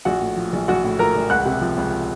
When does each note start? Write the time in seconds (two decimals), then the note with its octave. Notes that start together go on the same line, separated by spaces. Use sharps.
0.05 A#1 F#4 F#5
0.21 A2
0.36 F3
0.53 A#1
0.68 A#1 F#4 F#5
0.84 A2
0.99 F3 A#4 A#5
1.15 A#1
1.30 C#2 F#5 F#6
1.46 C3
1.61 F3
1.78 C#2